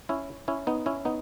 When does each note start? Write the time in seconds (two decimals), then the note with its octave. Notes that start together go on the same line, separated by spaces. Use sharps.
0.09 C#4 E4
0.48 C#4 E4
0.67 B3 D#4
0.86 C#4 E4
1.05 B3 D#4